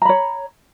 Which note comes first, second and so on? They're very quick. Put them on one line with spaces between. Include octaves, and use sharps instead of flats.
A#5 B5 C#5